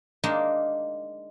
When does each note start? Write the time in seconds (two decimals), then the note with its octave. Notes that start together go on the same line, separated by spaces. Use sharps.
0.24 G#3 A#3 D4 D#4 A#4